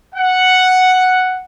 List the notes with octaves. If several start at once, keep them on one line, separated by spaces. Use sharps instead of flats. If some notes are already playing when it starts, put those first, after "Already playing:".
F#5